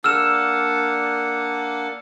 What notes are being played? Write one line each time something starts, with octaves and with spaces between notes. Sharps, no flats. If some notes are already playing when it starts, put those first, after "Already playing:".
A#3 D4 F#5 E6 F6 E7